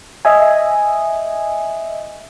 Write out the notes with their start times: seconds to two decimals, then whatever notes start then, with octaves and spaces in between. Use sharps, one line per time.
0.25 D#5 E5 G#5